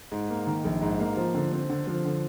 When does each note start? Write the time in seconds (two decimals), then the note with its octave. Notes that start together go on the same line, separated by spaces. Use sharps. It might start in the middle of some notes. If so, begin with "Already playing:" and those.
0.12 G#2
0.30 A#3
0.47 D#3
0.65 A#1
0.82 G#2
1.00 A#3
1.17 F3
1.34 D3
1.52 C4
1.70 D3
1.87 F3
2.05 D3